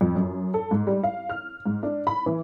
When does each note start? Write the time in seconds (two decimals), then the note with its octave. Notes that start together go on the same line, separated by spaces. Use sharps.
0.01 F2
0.15 F#2
0.54 A4
0.71 G#2
0.87 G3
1.03 F5
1.29 F6
1.66 G#2
1.83 D4
2.07 B5
2.26 E3